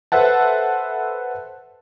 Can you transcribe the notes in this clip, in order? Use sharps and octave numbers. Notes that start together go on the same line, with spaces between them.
A4 B4 C5 E5 F#5 A5